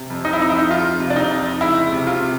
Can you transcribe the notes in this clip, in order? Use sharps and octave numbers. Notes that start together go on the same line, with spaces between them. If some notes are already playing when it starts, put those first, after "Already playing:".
Already playing: C3
F2
D#4
E4
F2 D#4
E4
D#4
F2 F4
C3
D4
D#4
F2
C#2 E4
C3
F4
C3